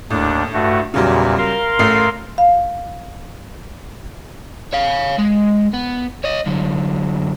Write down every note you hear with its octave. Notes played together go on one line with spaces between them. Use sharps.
D#2 A2 D4
G2 A3 F#4
E2 A#2 C#3 F#3 G3
A#4 F5 C6
A1 A3 C7
F5
C#5 F5
G#3
B3
C#5 D#5
F#2 D3